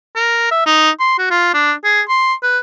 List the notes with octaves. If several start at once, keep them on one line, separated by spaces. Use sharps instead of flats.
A#4
E5
D#4
C6
F#4
F4
D4
G#4
C6
B4